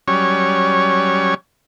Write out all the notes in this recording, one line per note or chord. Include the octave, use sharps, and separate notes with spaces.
F#3 G3 C#4 C#5